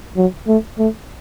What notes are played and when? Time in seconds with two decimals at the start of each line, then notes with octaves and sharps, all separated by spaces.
0.17 F#3
0.47 A3
0.78 A3